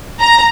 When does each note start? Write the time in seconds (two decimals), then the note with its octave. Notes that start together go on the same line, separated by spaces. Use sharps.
0.20 A#5